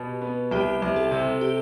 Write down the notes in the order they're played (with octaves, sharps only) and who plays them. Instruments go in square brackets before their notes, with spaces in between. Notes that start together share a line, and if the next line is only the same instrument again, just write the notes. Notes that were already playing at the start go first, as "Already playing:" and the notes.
Already playing: [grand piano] B2 [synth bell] G4
[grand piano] B3
[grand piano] C2 [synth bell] G4
[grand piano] C2
[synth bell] A4
[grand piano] C3
[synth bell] G4